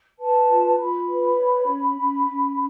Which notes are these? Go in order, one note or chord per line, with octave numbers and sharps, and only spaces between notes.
B4 A5
F4
F4 B5
B4
C#5
C#4
C#4
C#4